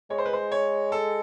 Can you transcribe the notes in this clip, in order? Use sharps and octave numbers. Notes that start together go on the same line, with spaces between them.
G#3 C#5
C5
B4
C5
C#5
A4